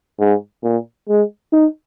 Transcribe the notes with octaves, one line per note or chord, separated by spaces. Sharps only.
G#2
A#2
G#3
D#4